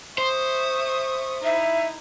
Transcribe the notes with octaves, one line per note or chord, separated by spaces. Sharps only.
C5 E5 C#6 D#6
D#4 E4 E5